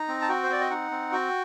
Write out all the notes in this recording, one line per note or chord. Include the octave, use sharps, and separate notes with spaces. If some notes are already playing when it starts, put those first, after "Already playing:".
Already playing: D#4 A#5
C4
A5
F#4 G5
C5
C4 D5
D#5
D#4 F#5
C4
F#4 G5